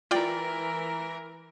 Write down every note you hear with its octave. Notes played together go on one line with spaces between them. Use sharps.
E3 F4 A#4 D5 G5